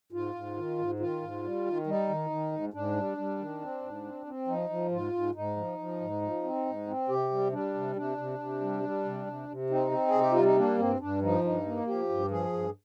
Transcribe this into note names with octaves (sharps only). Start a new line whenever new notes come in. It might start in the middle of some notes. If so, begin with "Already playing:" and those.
G#2 F4
G#2
D#3
G#2
D#3 F4
G#2
G3
D#3
G3 D#4
D#3
D#3
G#2
G#2 D4
G3
G3
D#3
C4
G#2
C4
C4
F3 D#4
F3
G#2 F4
G#2
G#2 D#4
F3
F3
G#2
F3
C4
G#2
C4
C3 G4
G3
G3 D4
C3
C3 D4
C3
C3
G3
G3
C3
C3
C3
C4 D#4
C4
G#4
C3
G4
G3 F4
D#4
A#3 D4
G2 C4
G2 D4
F3 D#4
G2 D#4
A#3
F3 G4
G2
F3 G#4
G2